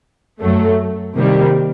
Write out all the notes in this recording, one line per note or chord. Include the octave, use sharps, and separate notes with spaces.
F#2 F#3 A3
C3 D#3 G3 A#3